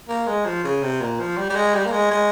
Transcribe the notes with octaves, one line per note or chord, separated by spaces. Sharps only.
A#3
G#3
F3
C#3
C3
A#2
F3
G3
G3
G#3
G3
A#3
G#3
G#3